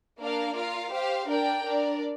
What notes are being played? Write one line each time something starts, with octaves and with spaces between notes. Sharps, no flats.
A#3 D4 A#4 D5 F5
F4 A#4 F5
G4 C5 F5
D4 A#4 D5 G5
D4 A#4 D5